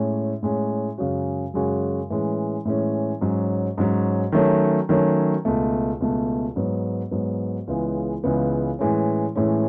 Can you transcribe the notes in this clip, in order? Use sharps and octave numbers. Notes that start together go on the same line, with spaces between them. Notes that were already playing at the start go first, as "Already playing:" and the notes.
Already playing: A2 G#3 C#4
A2 G#3 C#4
F#2 C#3 G#3 C#4 F#4
F#2 C#3 G#3 C#4 F#4
A2 E3 G#3 C#4
A2 E3 G#3 C#4
G#2 F#3 C#4
G#2 F#3 C#4
D#3 F#3 A3 C#4
D#3 F#3 A3 C#4
C#2 B2 A3
C#2 B2 A3
G#2 F#3 B3
G#2 F#3 B3
C#2 C#3 E3 G#3 B3
C#2 C#3 E3 G#3 B3
A2 E3 G#3 C#4
A2 E3 G#3 C#4